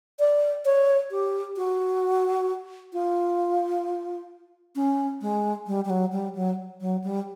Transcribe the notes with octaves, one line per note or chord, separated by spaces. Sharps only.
D5
C#5
G4
F#4
F4
C#4
G#3
G3
G3
F#3
G3
F#3
F#3
G3